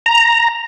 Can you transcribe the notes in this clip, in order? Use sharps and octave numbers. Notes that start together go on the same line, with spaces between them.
A#5